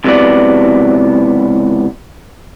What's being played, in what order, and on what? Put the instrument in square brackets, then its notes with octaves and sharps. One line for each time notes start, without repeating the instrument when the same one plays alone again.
[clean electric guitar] C#2 C3 E3 F#3 B3 D5